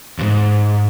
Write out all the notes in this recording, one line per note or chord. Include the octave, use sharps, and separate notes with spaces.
D#2 G#2